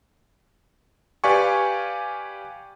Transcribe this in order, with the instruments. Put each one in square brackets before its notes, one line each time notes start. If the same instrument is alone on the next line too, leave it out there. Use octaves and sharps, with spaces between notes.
[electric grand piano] G4 B4 D5 F5 G#5 C#6